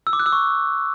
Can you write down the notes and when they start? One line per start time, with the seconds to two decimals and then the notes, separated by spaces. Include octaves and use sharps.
0.07 E6
0.13 D6
0.20 F#6
0.26 E6
0.32 C#6